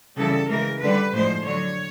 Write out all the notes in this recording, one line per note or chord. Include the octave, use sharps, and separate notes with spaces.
C#3 E3 G3 A4
C#3 E3 G#3 A#4
D3 G3 B4
A2 F3 G#3 C5
D3 F#3 C#5